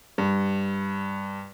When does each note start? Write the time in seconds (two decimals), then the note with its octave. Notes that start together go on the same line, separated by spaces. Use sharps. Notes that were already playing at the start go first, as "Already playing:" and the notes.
0.18 G2